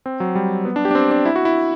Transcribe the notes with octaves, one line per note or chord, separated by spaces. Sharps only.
C4
F#3
G3
B3
D4
G4
D4
C4
D4
E4
F#4
E4